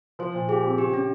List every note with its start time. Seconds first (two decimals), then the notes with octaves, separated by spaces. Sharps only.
0.19 F3 C5
0.34 A#2
0.49 G4 G#4
0.64 C4
0.78 C#3 G4
0.93 C#4